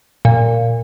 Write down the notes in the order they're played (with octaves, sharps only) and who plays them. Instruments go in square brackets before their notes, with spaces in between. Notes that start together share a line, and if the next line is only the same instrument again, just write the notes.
[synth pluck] A#2